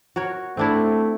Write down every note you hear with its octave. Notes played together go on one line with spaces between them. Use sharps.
F#4 A#4 C#5
A3 C4 D4 E4